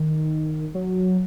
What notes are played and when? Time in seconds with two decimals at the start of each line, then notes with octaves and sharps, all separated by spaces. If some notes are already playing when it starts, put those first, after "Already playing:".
Already playing: D#3
0.75 F#3